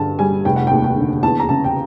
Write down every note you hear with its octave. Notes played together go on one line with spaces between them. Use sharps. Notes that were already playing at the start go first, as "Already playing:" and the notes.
Already playing: G2 D3 A5
G3 G#5
F1 G5
F#5
D#2 G5
G5
D3
E2 A5
A#5
C#3 A5
G5